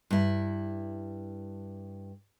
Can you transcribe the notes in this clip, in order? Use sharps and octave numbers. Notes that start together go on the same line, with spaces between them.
G2 E4